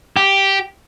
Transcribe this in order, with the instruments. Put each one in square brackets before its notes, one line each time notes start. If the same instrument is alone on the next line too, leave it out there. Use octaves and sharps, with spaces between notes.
[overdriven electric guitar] G4